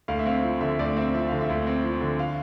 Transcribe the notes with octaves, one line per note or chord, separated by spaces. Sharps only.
D2 F5
E5
C4 F5
F3
D3 E5
D2 D5
C4 E5
F3 E5
D3 F5
E5
D2
C4
F3
D3
F5